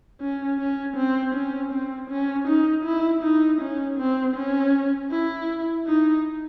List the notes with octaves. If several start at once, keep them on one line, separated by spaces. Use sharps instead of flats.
C#4
C#4
C4
C#4
C4
C#4
D#4
E4
D#4
C#4
C4
C#4
E4
D#4